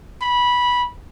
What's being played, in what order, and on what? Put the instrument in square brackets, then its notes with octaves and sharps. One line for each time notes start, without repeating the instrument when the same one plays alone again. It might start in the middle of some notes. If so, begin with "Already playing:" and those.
[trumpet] B5